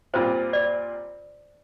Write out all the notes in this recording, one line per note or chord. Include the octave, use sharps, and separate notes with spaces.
A#2 G3 C4 F4 C5
D5